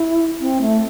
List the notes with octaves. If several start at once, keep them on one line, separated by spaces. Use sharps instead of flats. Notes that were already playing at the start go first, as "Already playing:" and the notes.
Already playing: E4
C4
A3